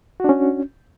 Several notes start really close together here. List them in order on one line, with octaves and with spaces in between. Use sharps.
F#4 D4 C#4